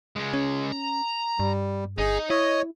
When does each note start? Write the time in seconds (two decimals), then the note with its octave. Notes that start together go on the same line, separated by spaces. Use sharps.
0.16 C#3 G#3
0.34 C#4
0.72 A#5
1.40 G2 G3
1.98 G1 D#4 G#4
2.30 E4 C#5 D#5